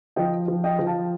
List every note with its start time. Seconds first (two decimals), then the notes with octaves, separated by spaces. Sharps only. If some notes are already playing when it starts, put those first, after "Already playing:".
0.16 F3 D#5 G5
0.48 F3
0.64 D#5 G5
0.79 F3
0.86 F5 A5